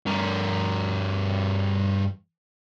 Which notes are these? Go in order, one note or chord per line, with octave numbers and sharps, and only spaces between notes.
G2 A#4